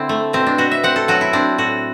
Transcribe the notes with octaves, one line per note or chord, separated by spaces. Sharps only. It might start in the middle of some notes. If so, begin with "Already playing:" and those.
Already playing: D3 C4 E4
A3
B2 C4
D4
B2 F#4
E5
C4 F#5
A4
F#3 F#4
E4
C4 D4
A2 F#4